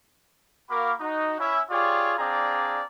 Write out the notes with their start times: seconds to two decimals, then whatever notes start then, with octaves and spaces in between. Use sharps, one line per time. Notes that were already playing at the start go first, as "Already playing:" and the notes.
0.70 A#3 F#4 A#4 F5 B5 D6
1.00 D#4 F#4
1.40 C#4 E4 E5
1.70 F4 G4 G#4 C#5 D5
2.18 C4 D4 G#4 D5 F5 A#5